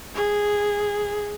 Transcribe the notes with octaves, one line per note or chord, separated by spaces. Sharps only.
G#4